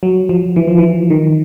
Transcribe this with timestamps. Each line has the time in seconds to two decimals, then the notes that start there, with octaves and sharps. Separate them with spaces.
0.03 F#3
0.29 F3
0.56 E3
0.67 F3
0.78 E3
1.10 D#3